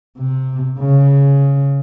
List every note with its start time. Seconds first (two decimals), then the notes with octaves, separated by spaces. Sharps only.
0.18 C3
0.79 C#3